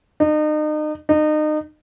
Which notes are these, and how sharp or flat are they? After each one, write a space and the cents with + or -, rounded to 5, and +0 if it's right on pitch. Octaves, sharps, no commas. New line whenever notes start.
D#4 -35
D#4 -30